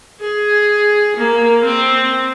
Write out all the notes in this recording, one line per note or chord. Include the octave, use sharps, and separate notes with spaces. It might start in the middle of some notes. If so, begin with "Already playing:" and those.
G#4
A#3
C4